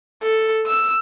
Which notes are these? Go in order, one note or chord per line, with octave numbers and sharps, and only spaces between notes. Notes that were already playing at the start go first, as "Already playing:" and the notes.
A4
E6